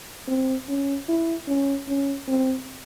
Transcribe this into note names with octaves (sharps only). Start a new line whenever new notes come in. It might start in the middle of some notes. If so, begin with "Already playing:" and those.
C4
C#4
E4
C#4
C#4
C4